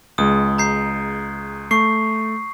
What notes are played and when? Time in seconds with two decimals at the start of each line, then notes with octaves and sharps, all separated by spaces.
0.18 C#2 G#3 D#6
0.58 A#5 G6 C7
1.71 A3 C#6 C7